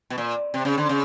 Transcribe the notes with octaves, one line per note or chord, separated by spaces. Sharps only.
B2
A#2
C3
C#3
D3
C#3